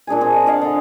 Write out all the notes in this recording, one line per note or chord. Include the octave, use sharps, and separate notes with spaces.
A#2 D4 G#4 G#5
C4 G#4
D#5
G#4 D#5 F5 F#5
D3 D4 A4